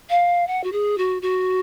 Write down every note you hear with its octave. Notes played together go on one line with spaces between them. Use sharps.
F5
F#5
F#4
G#4
F#4
F#4